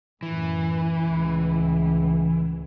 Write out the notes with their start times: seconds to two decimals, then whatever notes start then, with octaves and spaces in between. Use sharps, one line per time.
0.23 F#2 A2 E3
1.04 C#2 A2